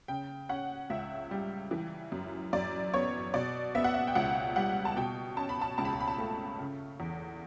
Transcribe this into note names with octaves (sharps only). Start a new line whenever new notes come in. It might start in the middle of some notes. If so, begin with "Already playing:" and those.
C#3 G5
C#4 F#5
C#2 E5
G3
E3
F#2
F#2 D5
B3 C#5
B2 D5
B3 E5
F#5
E5
G5
C#2 F#5
G3 F#5
A5
B2 G5
C#4 A5
B5
A5
C#2 A5
B5
A5
B5
A5
A3 B5
C#3
E2